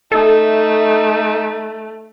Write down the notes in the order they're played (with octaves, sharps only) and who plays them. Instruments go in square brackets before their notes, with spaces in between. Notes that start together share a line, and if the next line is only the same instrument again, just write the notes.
[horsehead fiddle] A3 [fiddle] D#4 E5 [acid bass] A4